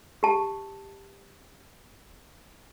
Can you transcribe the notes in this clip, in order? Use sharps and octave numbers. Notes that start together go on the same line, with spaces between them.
G4 A5